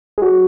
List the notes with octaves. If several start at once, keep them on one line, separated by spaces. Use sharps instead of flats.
G#3
F#3